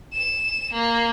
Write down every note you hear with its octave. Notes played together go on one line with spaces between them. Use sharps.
E7
A#3